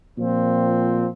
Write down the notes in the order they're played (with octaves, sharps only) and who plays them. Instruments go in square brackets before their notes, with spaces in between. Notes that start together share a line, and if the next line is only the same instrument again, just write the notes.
[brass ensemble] A#2 F3 C4